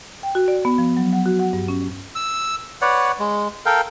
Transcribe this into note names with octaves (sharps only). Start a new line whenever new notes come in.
G5
F#4
D5
B3
F3
F#3
F#5
F#4
F#5
G2
C#4
E6
B4 C#5 D5 F#5
G#3
A4 A#4 F5 G5